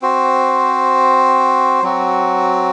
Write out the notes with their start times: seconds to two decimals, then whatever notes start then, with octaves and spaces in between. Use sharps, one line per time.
0.02 C4 F#4 C5
1.82 F#3 C4 F#4